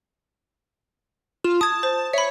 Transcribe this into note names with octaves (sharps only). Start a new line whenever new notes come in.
F4 E7
A5 D#6 G#6
C5
C#5 E5 B5